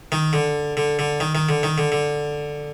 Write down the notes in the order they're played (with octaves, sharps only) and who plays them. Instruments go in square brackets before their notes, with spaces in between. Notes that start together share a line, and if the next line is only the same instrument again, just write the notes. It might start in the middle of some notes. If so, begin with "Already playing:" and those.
[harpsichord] D#3
D3
D3
D3
D#3
D#3
D3
D#3
D3
D3